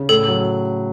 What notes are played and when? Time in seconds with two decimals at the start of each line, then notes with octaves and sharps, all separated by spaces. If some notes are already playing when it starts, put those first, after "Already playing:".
Already playing: C#3
0.09 A2 A4
0.28 F#3